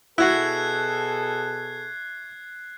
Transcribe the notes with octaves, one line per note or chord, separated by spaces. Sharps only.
B2 E4 F#4 G#4 A4 F#6 G#6 C7